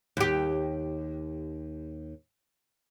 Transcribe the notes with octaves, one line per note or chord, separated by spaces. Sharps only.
D#2 G4